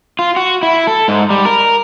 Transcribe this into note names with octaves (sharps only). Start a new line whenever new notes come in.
F4
F#4
E4
A4
G#2
G3
A#4